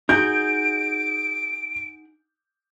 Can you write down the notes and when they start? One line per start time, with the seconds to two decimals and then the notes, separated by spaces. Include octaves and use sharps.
0.09 D#4 F#4 G#4 G6 D7